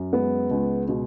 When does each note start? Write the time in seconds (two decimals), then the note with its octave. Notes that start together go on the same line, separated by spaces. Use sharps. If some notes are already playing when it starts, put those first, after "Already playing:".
Already playing: F#2
0.12 G#3 B3
0.51 C#2
0.89 B2